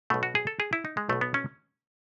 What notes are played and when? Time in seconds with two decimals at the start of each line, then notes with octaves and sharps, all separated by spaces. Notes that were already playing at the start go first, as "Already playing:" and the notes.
0.10 B1 B2 A3
0.23 F#4
0.35 G#4
0.47 A4
0.60 G#4
0.73 E4
0.85 D#4
0.97 G#3
1.09 B1 B2 A3
1.21 B3
1.34 C#4